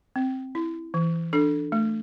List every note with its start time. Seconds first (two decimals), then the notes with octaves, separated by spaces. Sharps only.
0.16 C4
0.55 E4
0.94 E3
1.33 D4 A4
1.72 A3